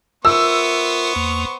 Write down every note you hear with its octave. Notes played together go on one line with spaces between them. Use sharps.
B3 F4 A#4 C5 E5 C#6 E6
E2 A#3